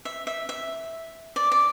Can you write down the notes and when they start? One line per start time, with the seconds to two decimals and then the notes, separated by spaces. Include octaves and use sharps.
0.05 E5
0.27 E5
0.49 E5
1.36 D5
1.52 D5